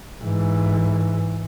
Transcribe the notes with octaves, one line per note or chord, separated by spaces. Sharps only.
G#2 E3